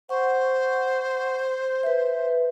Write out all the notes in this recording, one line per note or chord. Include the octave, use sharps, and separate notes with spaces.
C5 F#5 C#6
B4 E5